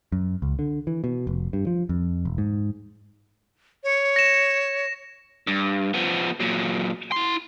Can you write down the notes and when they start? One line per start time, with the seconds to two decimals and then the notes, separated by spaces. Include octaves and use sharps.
0.12 F#2
0.42 C#2
0.59 D3
0.87 E3
1.04 B2
1.27 F1
1.53 G2
1.67 F3
1.89 F2
2.25 E1
2.38 G#2
3.83 C#5
4.16 A#6 E7
5.47 G2
5.94 F3 B3
6.40 A#2 F#3
7.12 E4 C6